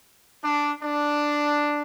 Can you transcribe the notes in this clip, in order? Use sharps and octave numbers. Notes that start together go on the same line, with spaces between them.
D4
D4